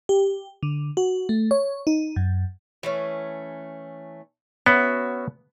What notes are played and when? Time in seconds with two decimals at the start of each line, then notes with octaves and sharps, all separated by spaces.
0.09 G4
0.63 D3
0.97 F#4
1.29 A3
1.51 C#5
1.87 D#4
2.16 F#2
2.83 E3 A3 C#4
4.66 B3 C#4 F#4 E5